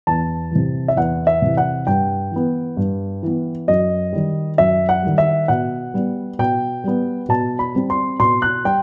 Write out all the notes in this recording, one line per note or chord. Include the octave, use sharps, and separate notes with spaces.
E2 A5
C3 E3
E5
E2 F#5
E5
C3 E3
F#5
G2 G5
E3 B3
G2
E3 B3
F#2 D#5
D#3 G3
F#2 E5
F#5
D#3 G3
E5
B2 F#5
G3 B3
B2 G5
G3 B3
B2 A5
B5
G3 C4
C6
B2 C6
F#6
G3 G5